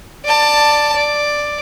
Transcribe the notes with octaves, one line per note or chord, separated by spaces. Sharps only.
D5 A5
D5